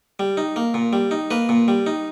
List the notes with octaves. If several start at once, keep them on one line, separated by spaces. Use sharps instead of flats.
G3
D#4
A#3
A#2
G3
D#4
A#3 B4
A#2
G3
D#4